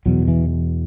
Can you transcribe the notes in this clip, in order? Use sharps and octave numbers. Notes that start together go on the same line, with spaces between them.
E2 B2 F#3
E3